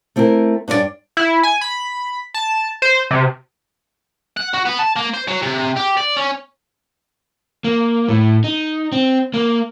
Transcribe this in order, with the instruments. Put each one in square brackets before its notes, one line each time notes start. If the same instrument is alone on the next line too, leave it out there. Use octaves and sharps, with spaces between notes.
[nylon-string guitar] A3 C4 E4 G4 A#4
G2 C#4 D4 E4 D5
[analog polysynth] E4
G#5
B5
A5
C5
C3
[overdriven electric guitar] F#5
F#4
B3
A5
A#3
C5
F#3
C3
G4
D5
C#4
A#3
A2
D#4
C4
A#3